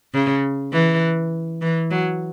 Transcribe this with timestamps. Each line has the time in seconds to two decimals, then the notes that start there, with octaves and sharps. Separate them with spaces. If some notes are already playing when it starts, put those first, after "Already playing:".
0.14 C#3
0.73 E3
1.62 E3
1.91 F#3